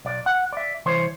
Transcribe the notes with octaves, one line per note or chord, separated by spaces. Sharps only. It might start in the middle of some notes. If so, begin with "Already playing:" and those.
B1 D5
F#5
D5 E5
C2 E3 C5 C#5